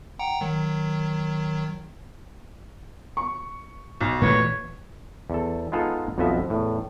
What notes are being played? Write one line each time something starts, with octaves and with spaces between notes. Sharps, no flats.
F#5 G5 A#5
D#3 F#3
C#6
B1
A#2 E3 A3 B4 C#5
E2 A4
G#3 B3 D#4 F4 G#4 A4
B1 F2 F3 B3 D#5 E5
E2 A2